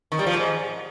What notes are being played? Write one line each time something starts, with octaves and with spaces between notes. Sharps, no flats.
D#3
G3
F3
G#2